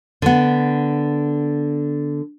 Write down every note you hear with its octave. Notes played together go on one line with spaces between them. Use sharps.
D3 B3